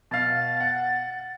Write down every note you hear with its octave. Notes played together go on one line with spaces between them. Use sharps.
B2 F5 A6
F#5